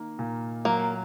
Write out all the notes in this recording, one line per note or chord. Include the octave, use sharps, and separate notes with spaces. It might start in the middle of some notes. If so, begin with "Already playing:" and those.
Already playing: D#3 A#3
A#2
F#3 A#3